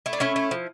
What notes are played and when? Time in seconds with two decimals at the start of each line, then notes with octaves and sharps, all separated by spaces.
0.06 A3 E4
0.13 D4
0.20 A3 C#4 E4
0.36 A3
0.51 F3